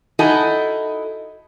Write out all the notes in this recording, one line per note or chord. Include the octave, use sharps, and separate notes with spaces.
D#4 E4 F#4 A4 D#5 G#5